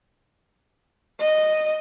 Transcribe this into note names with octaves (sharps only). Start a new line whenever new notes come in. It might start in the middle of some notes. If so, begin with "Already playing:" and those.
D#5